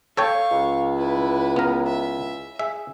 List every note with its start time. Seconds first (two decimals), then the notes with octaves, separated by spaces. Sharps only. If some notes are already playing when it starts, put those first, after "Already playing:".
0.17 A4 C#5 F5 G5 C#6
0.51 C#2
0.97 E4 B4
1.56 B3 A#4
1.87 E5
2.59 G#4 E5